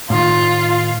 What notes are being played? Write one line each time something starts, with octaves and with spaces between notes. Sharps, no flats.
A2 D#3 F4